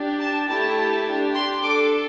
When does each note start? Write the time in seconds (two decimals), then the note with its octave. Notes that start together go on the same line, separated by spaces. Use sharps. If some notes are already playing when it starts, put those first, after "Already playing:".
Already playing: D4 G4
0.20 A5
0.49 A3 E4 G4 A5
0.78 A5
1.06 D4 G4
1.34 C6
1.63 D4 A4 D6